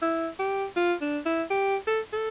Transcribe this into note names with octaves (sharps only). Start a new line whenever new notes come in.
E4
G4
F4
D4
E4
G4
A4
A4